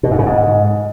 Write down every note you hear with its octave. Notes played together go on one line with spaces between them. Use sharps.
B2
G#2
C#3
G#2